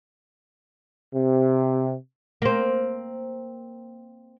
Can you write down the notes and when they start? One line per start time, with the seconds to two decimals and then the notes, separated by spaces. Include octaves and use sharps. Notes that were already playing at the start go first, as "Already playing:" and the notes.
1.14 C3
2.42 A#3 C4